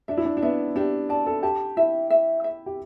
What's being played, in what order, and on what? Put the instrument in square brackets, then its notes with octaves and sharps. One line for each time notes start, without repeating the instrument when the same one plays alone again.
[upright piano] D4 [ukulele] E5
[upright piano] E4
D4
D4
[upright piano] B3 [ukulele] E5
[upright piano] D4 [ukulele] G4
[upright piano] D5 [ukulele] A5
[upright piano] A4
[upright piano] G4 [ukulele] A5
[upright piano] E4 [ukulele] E5
[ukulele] E5
E5
[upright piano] G4